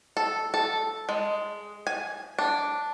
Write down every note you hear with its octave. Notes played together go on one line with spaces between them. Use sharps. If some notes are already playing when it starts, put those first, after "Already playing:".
A4
A4
G#3
G#5
D4